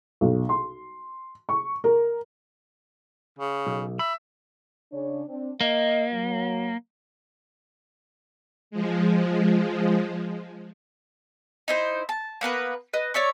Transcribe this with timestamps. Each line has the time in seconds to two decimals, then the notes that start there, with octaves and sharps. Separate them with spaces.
0.21 B1
0.49 C6
1.49 C#6
1.84 A#4
3.39 C#3
3.66 B1
3.99 E5 B5
4.92 C#3 D4 C#5
5.28 C4 D4
5.61 A#3 D#5
6.12 F#3
8.71 F3 G#3
11.68 D#4 E4 C5
12.09 A5
12.41 A#3 B3 A#4 B4
12.94 B4 D#5
13.14 C#5 D5 E5 C#6